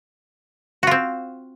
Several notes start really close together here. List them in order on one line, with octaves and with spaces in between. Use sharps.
F#4 F4 C4